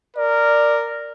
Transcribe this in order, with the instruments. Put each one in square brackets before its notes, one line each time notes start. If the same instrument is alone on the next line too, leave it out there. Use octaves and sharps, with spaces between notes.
[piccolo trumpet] A#4 [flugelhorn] D5